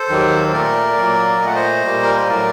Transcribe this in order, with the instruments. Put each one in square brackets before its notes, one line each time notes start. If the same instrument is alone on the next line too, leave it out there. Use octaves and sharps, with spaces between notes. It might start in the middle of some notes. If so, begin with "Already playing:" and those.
Already playing: [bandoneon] A4 C5
D#2 D#3 F#3 A#3
C5
A#2 A3 A#4 D5
A#2 F#3 A#3
A#2 D#5
A3 F#5
C5 D#5
A#2 G3 A#3
A#4
C5
A2 F#3 A3 A#4 D5